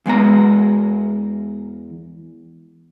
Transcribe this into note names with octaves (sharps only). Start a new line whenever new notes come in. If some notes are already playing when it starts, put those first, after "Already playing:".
E2 G#3 B3 A#5